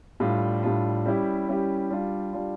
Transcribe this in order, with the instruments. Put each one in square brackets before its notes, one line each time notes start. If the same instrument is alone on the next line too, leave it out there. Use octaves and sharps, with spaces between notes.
[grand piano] A2 G3 D4 F4
A2 G3 D4 F4
G3 C#4 E4 G4
G3 C#4 E4 G4
G3 D4 F4
G3 D4 F4